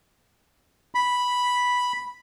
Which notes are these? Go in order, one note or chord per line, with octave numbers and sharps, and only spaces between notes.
B5